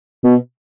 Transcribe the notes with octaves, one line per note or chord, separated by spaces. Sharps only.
B2